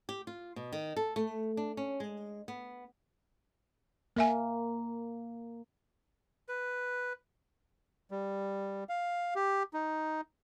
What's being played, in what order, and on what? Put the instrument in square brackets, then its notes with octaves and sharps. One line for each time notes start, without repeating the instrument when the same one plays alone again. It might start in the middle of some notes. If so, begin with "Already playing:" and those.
[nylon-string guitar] G4
F4
B2
D#3
A4
A3
D4
C#4
G#3
B3
[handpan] A#3 [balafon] A#4 E5 G#5
[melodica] B4
[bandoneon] G3
F5
G4
D#4